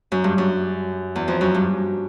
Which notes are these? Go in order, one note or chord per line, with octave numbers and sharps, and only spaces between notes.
F#2
G2
F#2
E2
F2
F#2
G2